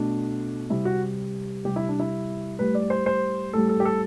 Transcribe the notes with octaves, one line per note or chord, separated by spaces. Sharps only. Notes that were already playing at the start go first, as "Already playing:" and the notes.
Already playing: B2 A3 D4
C3 G3 E4
F#4
C3 G3 G4
E4
D4
E4
A2 G3 B4
D5
C5
C5
A2 G3 A4
A4
G4
A4